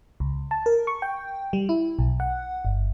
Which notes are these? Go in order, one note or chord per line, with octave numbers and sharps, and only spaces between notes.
C#2
A5
A#4
C#6
G5
G3
E4
B1
F#5
G1